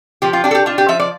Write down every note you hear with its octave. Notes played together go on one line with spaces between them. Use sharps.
F3 G4
F4
D4 G4
A4
G4
D4 F4
G4
F3 E5
D5